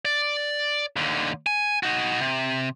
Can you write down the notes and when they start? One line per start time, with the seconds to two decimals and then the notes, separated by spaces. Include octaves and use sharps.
0.05 D5
0.96 D#2 D3
1.47 G#5
1.83 D#4 F#4
2.21 C3